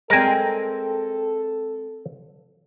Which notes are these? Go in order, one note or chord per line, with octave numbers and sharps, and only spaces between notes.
G#3 C4 A4 A#4 G#5